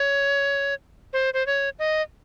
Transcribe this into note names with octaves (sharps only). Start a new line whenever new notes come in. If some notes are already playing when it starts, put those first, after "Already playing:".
Already playing: C#5
C5
C5
C#5
D#5